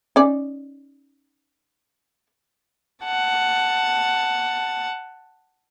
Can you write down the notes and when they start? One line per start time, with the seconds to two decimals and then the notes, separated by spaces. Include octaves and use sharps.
0.16 C#4 D#4 D5
3.05 F#5 A5